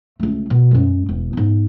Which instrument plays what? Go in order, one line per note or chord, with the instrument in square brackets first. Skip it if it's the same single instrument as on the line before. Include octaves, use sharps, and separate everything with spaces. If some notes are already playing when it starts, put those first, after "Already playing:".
[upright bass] C#2 A3
B2
F#2 G#3
E1
G#2 B3